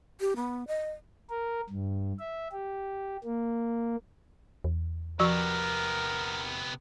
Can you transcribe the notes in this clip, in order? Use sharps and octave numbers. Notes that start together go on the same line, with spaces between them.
G4
B3
D#5
A#4
G2
E5
G4
A#3
E2
C3 F3 B3 F#4 A#4 C#6